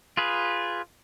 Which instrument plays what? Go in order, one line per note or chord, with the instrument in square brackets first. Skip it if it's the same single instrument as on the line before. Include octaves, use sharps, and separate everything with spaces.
[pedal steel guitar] F4 G#4 B4